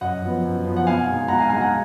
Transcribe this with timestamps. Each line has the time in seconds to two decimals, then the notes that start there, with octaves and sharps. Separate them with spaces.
0.01 F#2 D#5 F#5
0.22 F3 B3
0.44 F#2
0.65 F3 B3
0.76 F#5
0.87 B2 F5 G#5
1.07 G#3 D#4
1.28 B2 F#5 A#5
1.39 F5 G#5
1.50 D#4 F5 G#5
1.53 G#3
1.61 F#5 A#5